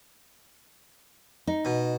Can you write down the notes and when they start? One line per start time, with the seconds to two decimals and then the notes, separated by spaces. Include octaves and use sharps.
1.47 D#4
1.65 B2